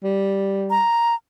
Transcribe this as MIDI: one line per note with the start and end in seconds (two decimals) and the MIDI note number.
0.03 0.82 55
0.70 1.15 82